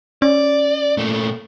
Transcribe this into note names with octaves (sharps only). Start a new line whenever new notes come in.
C#4 D5
A#2 A3